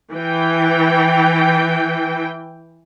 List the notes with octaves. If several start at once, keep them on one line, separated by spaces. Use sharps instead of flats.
E3 G5